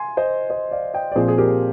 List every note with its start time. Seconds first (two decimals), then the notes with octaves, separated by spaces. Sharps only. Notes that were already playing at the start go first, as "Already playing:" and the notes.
Already playing: G#5 C6
0.17 C5 D#5
0.50 C5 D#5
0.71 D5 F5
0.94 D#5 G5
1.12 D5
1.15 A#2 F3 C4 G#4 C5
1.28 G#4
1.38 G4 A#4